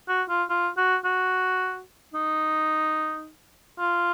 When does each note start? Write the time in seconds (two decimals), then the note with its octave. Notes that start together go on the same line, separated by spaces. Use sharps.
0.09 F#4
0.29 F4
0.49 F4
0.77 F#4
1.05 F#4
2.14 D#4
3.79 F4